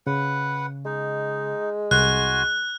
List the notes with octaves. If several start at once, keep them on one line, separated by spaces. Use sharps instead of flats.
C#3 B4 F#5
G#3 D#4
C2 F#4 G#5 C6 F#6